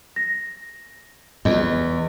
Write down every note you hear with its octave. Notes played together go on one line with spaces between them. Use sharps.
A#6
E2 D#5